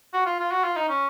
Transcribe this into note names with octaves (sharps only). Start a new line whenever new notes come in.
F#4
F4
F4
F#4
F4
D#4
C#4